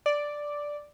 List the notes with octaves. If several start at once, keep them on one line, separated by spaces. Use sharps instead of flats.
D5